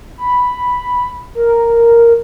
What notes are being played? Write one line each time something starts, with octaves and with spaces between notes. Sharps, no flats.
B5
A#4